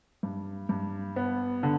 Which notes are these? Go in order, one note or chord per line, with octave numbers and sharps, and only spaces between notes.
G2
G2
B3
D3